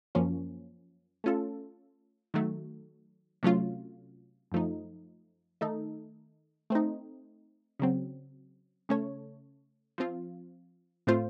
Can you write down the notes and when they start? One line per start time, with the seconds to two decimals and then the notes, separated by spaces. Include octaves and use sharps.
0.15 F#2 F3 A#3 C#4
1.24 A3 C#4 F4 A4
2.34 D#3 F#3 A3
3.43 C3 F#3 A3 C#4 F4
4.52 F#2 F3 A3 D#4
5.61 D#3 A3 D#4 A4
6.70 A3 C4 D#4
7.79 C#3 F#3 C4
8.89 C#3 A3 C#4 A4 C#5
9.98 F3 C4 F4
11.07 A2 A3 C4 F4 C5